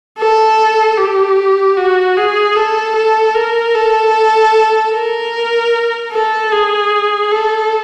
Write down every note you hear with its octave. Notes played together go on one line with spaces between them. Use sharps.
A4
G4
F#4
G#4
A4
A4
A#4
A4
A#4
A4
G#4
A4